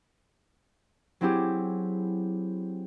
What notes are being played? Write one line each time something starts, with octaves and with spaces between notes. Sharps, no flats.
F#3 C4 E4 G4 G#4